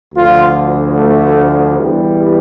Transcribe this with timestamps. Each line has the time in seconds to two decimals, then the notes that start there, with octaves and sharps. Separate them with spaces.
0.15 D2 D3 F3 F4
0.95 A3
1.77 E2 E3 G3